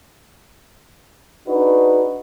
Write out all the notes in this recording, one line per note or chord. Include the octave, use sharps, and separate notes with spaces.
D4 D#4 F#4 G#4 B4